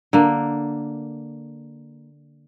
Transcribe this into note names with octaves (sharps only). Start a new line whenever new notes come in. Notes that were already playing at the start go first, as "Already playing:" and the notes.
D3 A#3